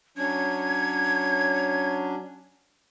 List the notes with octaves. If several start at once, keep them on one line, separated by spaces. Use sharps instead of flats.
F#3 C#4 D4 G#6